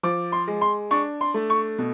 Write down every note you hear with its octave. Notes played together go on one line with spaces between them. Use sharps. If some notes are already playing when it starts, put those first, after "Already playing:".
F3 D6
C6
G#3
C6
D4 C#6
C6
A3
C#6
B2